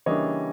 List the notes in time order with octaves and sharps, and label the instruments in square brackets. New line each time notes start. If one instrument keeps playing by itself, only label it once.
[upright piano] C#3 E3 G3 A#3 D4 C#5 D#5